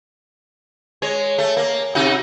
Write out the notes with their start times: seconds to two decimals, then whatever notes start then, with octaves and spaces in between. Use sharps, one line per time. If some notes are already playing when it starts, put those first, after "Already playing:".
1.02 G#3 C#5
1.38 A3
1.57 A#3
1.95 C3 D#4 F#4